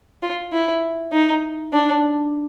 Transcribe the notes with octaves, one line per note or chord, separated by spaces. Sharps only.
F4
E4
D#4
D4